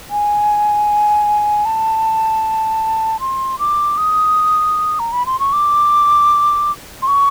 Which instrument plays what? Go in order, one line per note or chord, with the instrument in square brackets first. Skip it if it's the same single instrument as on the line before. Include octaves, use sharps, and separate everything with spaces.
[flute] G#5
A5
C6
D6
D#6
A#5
B5
C6
C#6
D6
C6
C#6